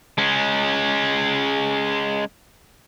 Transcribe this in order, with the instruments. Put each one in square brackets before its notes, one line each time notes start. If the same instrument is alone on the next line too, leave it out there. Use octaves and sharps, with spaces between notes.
[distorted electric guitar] G#3 C#4